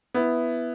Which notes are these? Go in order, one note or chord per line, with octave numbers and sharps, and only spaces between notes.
B3 E4